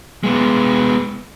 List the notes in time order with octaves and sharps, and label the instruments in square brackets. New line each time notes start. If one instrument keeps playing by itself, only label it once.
[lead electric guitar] G#3 B3